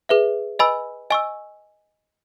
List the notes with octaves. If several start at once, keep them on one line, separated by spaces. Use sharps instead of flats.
G#4 B4 E5
B4 D#5 G#5 B5 E6
D#5 G#5 C#6 E6